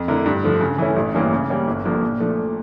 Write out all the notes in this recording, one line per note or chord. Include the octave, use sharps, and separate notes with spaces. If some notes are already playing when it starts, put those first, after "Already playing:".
Already playing: F2
D3 A3 E4 A#4
G2
D3 F3 A3
C#3
E3 A3 C#4 E4
A1
G2 E3 A#3 C#4
C#3
G3 A#3 C#4
G1
G2 D3 F3 A#3
A#2
F3 A3 D4